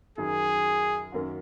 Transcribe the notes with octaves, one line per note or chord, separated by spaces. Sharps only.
F#2 D#3 F#3 G#4
F#2 D#3 A#3 C#4 F#4